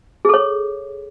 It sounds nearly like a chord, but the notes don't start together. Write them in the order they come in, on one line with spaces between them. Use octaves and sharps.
G#4 A4 C#5